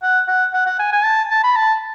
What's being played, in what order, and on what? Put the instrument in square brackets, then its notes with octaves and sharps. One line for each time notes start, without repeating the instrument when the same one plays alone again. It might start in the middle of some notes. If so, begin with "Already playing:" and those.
[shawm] F#5
F#5
F#5
F#5
G#5
G#5
A5
A5
B5
A5